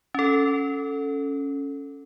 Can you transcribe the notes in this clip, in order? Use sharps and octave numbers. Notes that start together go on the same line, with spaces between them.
C#4 A4